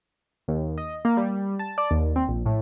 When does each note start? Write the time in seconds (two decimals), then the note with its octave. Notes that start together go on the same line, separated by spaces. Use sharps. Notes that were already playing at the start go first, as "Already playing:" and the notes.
0.48 D#2
0.78 D#5
1.05 A#3
1.17 G3
1.59 A5
1.78 D5
1.91 D#2
2.16 C4
2.28 A#1
2.46 A2